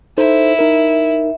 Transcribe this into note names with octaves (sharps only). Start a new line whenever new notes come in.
D#4 E4 A4 C5
D#4 A#4